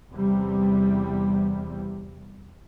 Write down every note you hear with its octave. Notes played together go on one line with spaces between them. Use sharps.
E2 C3 G3